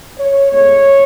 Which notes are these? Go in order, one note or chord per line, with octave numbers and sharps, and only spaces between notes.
C#5
A2 G#3 B3 C#5